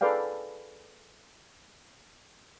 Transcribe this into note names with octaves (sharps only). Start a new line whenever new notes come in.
G#4 A4 B4 D5 F5 G5